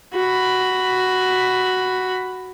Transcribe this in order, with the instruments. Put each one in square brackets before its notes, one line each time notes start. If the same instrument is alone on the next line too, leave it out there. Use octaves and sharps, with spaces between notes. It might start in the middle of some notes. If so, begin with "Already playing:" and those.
[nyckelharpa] F#4 B5